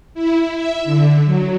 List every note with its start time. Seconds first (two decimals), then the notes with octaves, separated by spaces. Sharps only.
0.14 E4
0.54 E5
0.85 D3
1.25 F#3